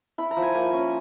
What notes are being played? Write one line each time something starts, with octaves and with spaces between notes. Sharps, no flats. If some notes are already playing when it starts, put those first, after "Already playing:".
E4 B5
A#5
F3
G#5
A#3 G#5
C#4